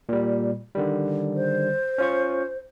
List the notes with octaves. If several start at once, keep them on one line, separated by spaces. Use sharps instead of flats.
A#2 G3
D3 D#3 G3
C5
C#4 F4 C#6